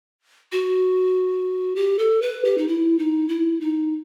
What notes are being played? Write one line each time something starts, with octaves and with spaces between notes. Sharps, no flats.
F#4
G4
A4
B4
G4
D#4
E4
D#4
E4
D#4